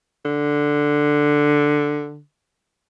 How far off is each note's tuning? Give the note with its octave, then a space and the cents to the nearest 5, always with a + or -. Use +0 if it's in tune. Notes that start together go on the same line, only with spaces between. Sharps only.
D3 +5